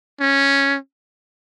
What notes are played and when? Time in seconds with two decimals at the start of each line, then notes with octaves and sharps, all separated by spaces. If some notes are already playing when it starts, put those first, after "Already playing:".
0.20 C#4